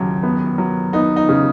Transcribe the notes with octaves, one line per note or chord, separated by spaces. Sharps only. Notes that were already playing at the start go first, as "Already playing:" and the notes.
Already playing: D#2 C#3 F#3
B3
F#3
B3 D#4
D#4
C#3